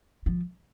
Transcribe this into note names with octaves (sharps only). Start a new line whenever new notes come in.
F3